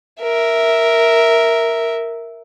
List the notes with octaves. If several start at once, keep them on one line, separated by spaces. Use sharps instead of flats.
A#4 E5